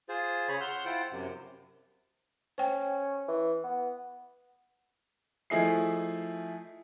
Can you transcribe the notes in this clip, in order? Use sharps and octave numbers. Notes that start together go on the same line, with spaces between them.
F4 G#4 C5
C#3 G#4 C#5 B5
F#5 C6 E6 F6 G6
E4 F4 C5 F#5 G5
F#2 C3
C#4 C5 G5
E3
B3
F3 A3 E4 G#4 D#5 C7